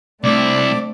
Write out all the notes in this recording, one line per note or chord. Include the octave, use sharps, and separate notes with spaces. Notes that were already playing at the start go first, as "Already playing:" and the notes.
C2 A3 C4 D4 E4 D5